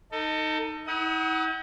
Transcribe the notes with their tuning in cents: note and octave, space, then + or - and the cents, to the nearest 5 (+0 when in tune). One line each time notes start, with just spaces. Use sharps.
D#4 +0 A4 +25
E4 -45 F#5 +30 D#6 +25